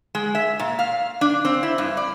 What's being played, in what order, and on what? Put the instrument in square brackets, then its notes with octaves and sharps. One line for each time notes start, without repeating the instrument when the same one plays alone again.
[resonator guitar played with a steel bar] G#3
E5
A#2
F5
D4
C4
E4
G2
D5